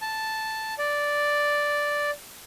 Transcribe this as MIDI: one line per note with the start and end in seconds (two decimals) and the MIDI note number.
0.02 0.74 81
0.78 2.11 74